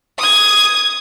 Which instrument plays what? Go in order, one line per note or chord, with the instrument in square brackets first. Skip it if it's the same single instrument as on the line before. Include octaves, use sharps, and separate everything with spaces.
[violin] D#6 G#6